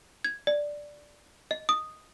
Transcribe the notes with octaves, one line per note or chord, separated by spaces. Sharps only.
G#6
D5
D#5
D#6